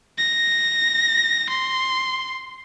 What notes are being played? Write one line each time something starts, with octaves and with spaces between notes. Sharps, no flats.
A#6
C6